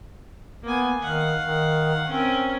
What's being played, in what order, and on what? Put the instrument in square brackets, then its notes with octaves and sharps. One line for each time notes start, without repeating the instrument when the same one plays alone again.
[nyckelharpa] A#3 G#5 [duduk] B3
[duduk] D#3 [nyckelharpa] F5 F#5
[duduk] D#3
[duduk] C4 [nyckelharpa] C#4 A#4